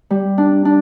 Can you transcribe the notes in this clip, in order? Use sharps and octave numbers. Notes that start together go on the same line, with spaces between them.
G3
D4
D4